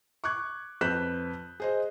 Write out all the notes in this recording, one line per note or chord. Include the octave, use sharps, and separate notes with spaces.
C#6 D6 F#6 G#6
F2 B4 F#6 G6 B6 E7
G#4 C5 D#5